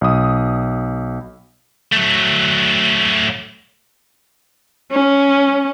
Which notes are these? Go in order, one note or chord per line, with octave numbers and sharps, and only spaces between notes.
B1 D#6
F#3 A3
C#4